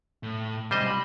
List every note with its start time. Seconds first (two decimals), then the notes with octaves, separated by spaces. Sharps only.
0.23 A2
0.71 C3 G3 G#3 C5 D#5
0.87 B5